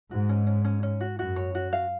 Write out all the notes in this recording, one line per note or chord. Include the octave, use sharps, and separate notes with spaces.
G#2 F#4
C#4
C#4
C#4
C#4
F#4
F#2 F#4
C#5
F#4
F5